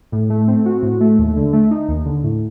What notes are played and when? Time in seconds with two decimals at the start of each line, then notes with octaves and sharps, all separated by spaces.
0.12 A2
0.30 A3
0.48 C4
0.66 F#4
0.83 A2
1.01 A3
1.18 D#2
1.36 D3
1.53 A3
1.71 D#4
1.88 D#2
2.06 D3
2.24 A2